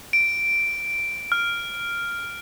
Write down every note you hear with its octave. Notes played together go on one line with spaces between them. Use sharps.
D7
F6